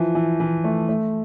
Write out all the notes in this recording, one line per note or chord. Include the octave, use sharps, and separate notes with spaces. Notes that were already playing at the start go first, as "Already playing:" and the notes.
Already playing: E3 F3
E3
E3
A3
A3